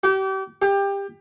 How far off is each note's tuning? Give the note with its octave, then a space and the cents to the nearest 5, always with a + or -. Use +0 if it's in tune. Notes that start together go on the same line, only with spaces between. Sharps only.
G4 -35
G4 +20